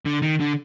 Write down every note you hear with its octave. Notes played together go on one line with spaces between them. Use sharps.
D3
D#3
D3